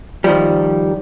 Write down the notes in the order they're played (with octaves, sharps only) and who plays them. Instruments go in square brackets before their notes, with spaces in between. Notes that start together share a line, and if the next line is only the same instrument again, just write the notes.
[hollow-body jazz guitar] D#3 F3 G3